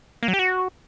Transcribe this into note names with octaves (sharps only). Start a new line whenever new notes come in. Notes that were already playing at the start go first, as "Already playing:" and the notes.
A#3
F#3
G4
F#4